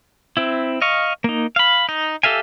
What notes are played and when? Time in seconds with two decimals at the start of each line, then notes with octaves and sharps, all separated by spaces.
0.37 C4 E4
0.82 D#5 F5 C#6
1.24 A#3 D#4
1.56 F5 B5
1.89 D#4
2.23 G4 A4 E5 F5 G#5